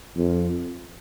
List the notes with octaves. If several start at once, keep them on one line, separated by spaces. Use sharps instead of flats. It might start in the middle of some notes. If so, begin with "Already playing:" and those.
F2